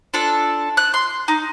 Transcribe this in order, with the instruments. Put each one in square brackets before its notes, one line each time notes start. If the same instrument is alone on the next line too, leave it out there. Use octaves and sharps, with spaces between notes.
[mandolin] D4 F4 A4 F#6
F#6
C6
D#4